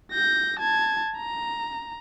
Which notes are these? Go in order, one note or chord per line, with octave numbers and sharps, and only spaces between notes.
G6 A#6
A5 G#6
A#5